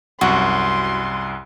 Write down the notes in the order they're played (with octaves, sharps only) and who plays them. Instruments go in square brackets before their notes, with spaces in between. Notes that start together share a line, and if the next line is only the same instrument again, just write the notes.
[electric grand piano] C2 F#2 [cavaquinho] F#4 [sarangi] C6